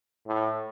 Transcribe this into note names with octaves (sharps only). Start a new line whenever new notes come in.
A2